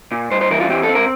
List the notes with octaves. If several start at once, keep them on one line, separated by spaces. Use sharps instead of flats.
A#2
G2 C5
C5
E3 A#4
F4
C4 G4
A4
C4
A#4